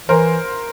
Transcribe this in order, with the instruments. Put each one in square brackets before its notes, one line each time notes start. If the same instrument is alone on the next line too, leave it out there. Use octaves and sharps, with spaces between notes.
[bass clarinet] E3 [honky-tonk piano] A#4 C5